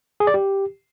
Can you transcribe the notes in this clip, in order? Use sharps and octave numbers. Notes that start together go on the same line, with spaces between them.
G#4
D5
G4